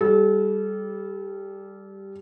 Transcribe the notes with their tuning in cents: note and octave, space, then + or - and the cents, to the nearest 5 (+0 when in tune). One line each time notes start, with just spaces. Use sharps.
G3 +0 A4 -35